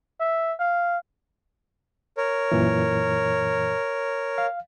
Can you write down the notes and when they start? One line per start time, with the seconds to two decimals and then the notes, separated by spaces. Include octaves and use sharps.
0.20 E5
0.59 F5
2.17 A#4 C#5
2.52 F#2 A#2 E3
4.38 F5